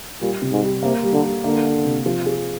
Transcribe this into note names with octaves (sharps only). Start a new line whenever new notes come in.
A#2 G3
C3
G#2
G3
C3 A#3
G3
D3
G3
D3 A#3
A#3
C3
F3
G#4